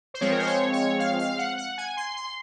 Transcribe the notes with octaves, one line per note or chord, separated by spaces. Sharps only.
C5
F3 G#3 C4 C#5
A#4
C5
C#5
C#5
F5
F5
F#5
F#5
G#5
C6
C6